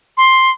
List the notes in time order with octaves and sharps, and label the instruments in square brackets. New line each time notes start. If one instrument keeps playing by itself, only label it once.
[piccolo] C6